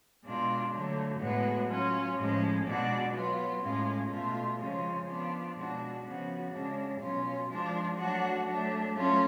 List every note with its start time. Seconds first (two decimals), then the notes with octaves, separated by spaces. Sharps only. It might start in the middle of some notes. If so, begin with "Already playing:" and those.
0.24 B2 G#3 D4 F4
0.72 D3 F#3 A3
1.20 A2 G#3 B3 F#4
1.69 F#3 C#4 F4
2.17 A2 F3 G#3 C#4
2.66 B2 G#3 D4 F#4
3.14 F#3 B3 F4
3.63 A2 G#3 C#4 F4
4.11 B2 A3 F4
4.59 C#3 F3 G#3 C#4 F4
5.07 F3 B3 D4 F4
5.56 B2 G#3 D4 F#4
6.05 C#3 F3 B3 F#4
6.52 C#3 G#3 D4
7.01 B2 F#3 C#4 F4
7.50 F3 G#3 D4 F4
7.98 F#3 A3 D4 F#4
8.46 F#3 A3 D4
8.95 F#3 A3 C#4 F4